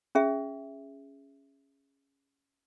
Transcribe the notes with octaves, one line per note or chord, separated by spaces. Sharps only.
C#4 G#4 E5